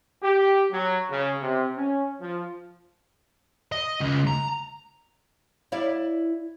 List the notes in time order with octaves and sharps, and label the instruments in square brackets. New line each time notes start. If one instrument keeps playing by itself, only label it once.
[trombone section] G4
F#3
C#3
C3
C#4
F3
[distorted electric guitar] D#5
C#2
A#5
[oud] E4 D5 F5